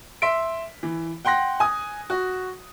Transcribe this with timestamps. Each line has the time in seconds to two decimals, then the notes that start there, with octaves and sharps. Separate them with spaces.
0.22 E5 C6 B6 D7
0.83 E3
1.25 F#5 G5 C6 F#6 A#6
1.60 G#5 D#6
2.10 F#4